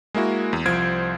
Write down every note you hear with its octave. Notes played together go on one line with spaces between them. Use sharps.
G#3 A#3 E4 F#4
E2
C2 F3 C5 G#6 D7